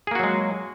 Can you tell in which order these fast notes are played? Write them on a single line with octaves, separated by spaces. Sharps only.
G#4 A#3 F#4 F#3 G#3